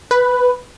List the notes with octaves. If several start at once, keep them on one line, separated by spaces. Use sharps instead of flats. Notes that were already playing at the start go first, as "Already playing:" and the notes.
B4